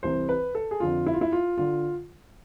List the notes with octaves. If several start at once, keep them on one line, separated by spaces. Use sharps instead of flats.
C2 C3 E3 C5
B4
A4
G#4
F2 D3 F3 F4
E4
F4
E4
F4
D3 F4